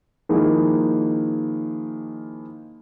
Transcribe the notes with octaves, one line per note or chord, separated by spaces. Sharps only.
D#3 F3 G#3 A#3 D#4 E4